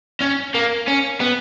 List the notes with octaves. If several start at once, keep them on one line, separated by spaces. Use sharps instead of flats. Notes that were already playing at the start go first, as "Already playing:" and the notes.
C#4
A#3
C#4
B3